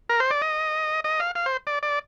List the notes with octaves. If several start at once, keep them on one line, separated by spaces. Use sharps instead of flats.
A#4
C5
D5
D#5
D#5
F5
F5
C5
D5
D5